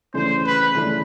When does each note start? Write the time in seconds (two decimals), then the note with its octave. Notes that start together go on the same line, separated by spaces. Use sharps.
0.14 C#3 E3 A3 D4 C5
0.44 B4
0.74 C#3 E3 A3 D4